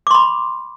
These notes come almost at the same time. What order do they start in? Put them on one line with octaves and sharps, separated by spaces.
D6 C6 B5